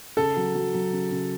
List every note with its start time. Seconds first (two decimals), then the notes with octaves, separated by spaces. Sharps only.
0.17 C#3 A4
0.36 F#3
0.55 F#3
0.74 F#3
0.92 C#3
1.11 C#3